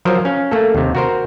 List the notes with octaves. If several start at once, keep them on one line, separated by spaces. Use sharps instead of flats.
F3 F#3 A#4 C5
C#4 F5
A3 A#3 A4
D#2 C3
F#4 A#4 C5